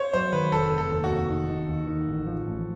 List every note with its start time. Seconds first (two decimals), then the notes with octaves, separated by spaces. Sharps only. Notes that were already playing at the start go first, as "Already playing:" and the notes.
Already playing: C5 C#5
0.13 F#3 C5
0.33 D#3 B4
0.52 F1 A4
0.72 F1
0.78 A4
0.91 D#2
1.04 F#4
1.10 F1
1.30 D#3
1.50 D#3
1.69 D#2
1.87 D#3
2.07 A1
2.27 F3
2.46 A1